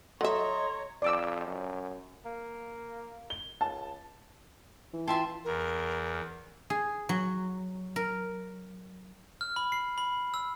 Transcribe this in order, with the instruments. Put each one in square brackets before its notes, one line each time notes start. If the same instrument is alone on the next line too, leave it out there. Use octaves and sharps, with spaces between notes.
[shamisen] F#3 E5 [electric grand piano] A4 D#5 [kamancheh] C#5 A#5 [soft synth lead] C6
[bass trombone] F2 [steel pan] D5 D6 E6
[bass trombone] F#2
[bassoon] A#3
[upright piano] G7
[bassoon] C#2 [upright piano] A5
[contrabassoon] E3
[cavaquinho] F4 E5 C6 [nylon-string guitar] G5 [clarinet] A5
[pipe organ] E2 [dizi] A#4
[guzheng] G#4
F#3
A#4
[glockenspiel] F6
B5
C7
B5
E6